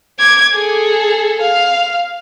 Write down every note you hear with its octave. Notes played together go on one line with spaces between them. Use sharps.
D6 G#6
G#4 A4
F5